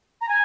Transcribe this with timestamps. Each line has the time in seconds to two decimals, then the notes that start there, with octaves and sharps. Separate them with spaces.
0.21 A#5
0.29 G#5